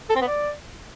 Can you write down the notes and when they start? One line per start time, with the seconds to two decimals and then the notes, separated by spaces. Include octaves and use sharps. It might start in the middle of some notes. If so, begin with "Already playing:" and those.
0.10 A4
0.15 C4
0.21 B3
0.27 D5